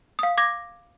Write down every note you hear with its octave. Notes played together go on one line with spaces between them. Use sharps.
F5 D#6
D6 G#6 A#6